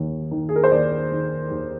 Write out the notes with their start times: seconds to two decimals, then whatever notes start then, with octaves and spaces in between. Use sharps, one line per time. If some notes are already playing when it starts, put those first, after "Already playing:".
Already playing: D#2 D#3
0.31 D#3
0.49 G#4
0.56 A#4
0.64 C5
0.71 D#2 D5
1.12 D#3
1.51 D#2